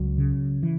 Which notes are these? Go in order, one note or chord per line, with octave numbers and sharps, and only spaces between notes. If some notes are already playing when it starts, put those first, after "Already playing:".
Already playing: C#2 F#3
C#3
E3